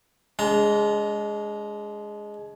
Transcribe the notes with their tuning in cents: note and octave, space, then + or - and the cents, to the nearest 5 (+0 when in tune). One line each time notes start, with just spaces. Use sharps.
G#3 +0 D4 -45 A#5 +0